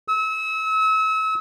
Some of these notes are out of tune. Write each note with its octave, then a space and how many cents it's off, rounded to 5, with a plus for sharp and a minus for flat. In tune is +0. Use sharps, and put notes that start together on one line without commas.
E6 -35